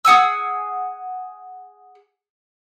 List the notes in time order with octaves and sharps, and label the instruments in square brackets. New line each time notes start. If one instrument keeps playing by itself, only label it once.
[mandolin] G#4 F#5 G#5 E6